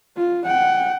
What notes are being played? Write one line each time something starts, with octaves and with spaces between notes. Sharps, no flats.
F4
F#5 G5